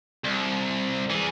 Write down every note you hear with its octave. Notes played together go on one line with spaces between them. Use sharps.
C2
E3 G#4